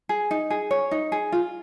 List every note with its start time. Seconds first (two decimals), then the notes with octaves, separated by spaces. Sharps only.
0.09 G#4
0.31 D#4
0.50 G#4
0.71 C#5
0.91 D#4
1.12 G#4
1.32 F4